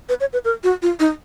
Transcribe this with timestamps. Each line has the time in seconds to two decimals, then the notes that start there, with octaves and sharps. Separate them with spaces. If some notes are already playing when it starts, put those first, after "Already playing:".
0.09 B4
0.20 C#5
0.33 B4
0.45 A#4
0.64 F#4
0.82 F4
1.00 D#4